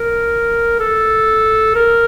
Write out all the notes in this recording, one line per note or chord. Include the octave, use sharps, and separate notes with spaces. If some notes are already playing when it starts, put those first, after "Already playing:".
Already playing: A#4
A4
A#4